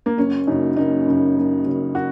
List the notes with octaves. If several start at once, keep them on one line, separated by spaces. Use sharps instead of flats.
A#3
F#1 C#4
F#2 C#3 D#4
F#1 D#4
F#2 C#3
F#1
F#2 C#3
F#4